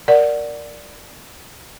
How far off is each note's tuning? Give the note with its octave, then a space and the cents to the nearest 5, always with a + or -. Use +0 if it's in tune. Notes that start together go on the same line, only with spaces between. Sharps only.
A#4 +0 D5 +0 F#5 +0